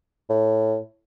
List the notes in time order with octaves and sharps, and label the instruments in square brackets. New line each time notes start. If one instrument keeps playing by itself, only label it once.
[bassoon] A2